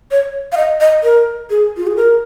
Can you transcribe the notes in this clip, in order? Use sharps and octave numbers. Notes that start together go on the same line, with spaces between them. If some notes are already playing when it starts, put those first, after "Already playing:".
C#5
F5
D#5
D#5
A#4
G#4
F4
G#4
A#4